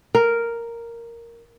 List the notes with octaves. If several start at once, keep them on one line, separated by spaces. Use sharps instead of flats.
A#4